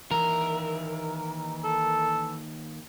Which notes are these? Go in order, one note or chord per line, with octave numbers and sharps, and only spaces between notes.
D#2 E3 A#4 E5
A4